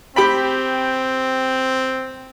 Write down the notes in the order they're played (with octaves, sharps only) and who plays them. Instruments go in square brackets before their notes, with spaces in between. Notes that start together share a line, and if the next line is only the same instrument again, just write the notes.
[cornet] C4 [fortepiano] G4 G5 B5